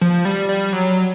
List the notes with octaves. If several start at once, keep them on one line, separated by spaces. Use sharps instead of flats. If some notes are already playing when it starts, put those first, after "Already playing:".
F3
G3
G3
F#3